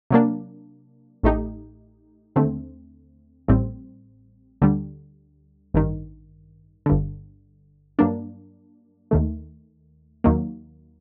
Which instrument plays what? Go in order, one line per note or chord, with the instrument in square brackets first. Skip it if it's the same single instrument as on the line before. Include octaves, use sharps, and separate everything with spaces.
[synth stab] C3 F#3 A#3 D4
A1 A2 A3 D#4 G4
D#2 D3 A3 C4
A1 A2 G3 C4
D2 D3 G3
A1 G2 D#3
G1 G2 D3
G2 F#3 A#3 D4
D#2 D#3 A3
D#2 D#3 F#3 A#3